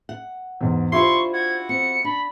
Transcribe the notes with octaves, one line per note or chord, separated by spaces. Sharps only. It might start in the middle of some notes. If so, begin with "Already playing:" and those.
F#5
E2 G#2
D4 E4 F4 G4 C5 C6 C#6
F#4 G#6
C4 C#7
D4 B5